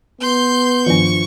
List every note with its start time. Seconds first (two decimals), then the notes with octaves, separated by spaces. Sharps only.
0.21 B3 C6 G6
0.86 G2 D#3 F3 D4 C#6